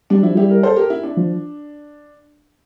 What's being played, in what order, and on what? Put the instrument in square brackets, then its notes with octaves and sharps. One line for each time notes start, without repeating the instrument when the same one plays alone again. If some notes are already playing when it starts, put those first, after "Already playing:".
[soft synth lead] G3 [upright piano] D4
[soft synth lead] F3 [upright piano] E4
[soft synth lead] G3 [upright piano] E4 G4
[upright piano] G4 A#4
A4 C5
G4 A#4
E4
D4
[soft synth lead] F3